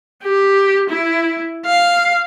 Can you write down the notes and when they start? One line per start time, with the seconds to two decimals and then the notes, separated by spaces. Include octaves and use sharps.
0.23 G4
0.90 E4
1.66 F5